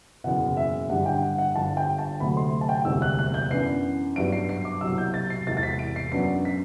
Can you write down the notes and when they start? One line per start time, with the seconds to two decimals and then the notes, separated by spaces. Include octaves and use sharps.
0.24 F#1 E2 B2 F#5
0.57 E5
0.90 G2 D3 G3 F#5
1.06 G5
1.22 F#5
1.38 F#5
1.56 G1 G2 D3 A5
1.77 G5
1.98 A5
2.20 D2 C3 F#3 A3 B5
2.37 C6
2.61 A5
2.69 G5
2.85 E1 D2 C3 G3 E6
3.02 F#6
3.19 F#6
3.34 G6
3.51 F#2 E3 B3 D4 C7
4.16 G2 F#3 B3 D4 D7
4.32 C7
4.49 C7
4.65 D6
4.81 C2 B2 F#3 E6
4.98 G6
5.14 A6
5.30 C7
5.47 E1 E2 C3 A6
5.57 A6
5.63 B6
5.79 D7
5.96 C7
6.12 F#2 F#3 B3 D4 C7
6.45 B6